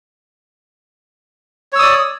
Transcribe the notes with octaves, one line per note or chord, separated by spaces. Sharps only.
C#5 D5 D#6 E6